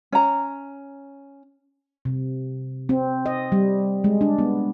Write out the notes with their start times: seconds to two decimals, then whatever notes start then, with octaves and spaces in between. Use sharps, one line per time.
0.12 C#4 A#5
2.05 C3
2.89 C4
3.26 D#5
3.52 G3
4.04 G#3
4.21 D4
4.39 B3